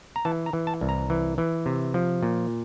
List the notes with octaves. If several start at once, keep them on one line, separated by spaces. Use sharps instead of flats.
A#5
E3 A5
A#5
E3
A5
C2
A#5
E3
E3
C3
F3
A#2